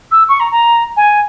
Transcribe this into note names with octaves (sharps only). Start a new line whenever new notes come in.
E6
C#6
A#5
A#5
G#5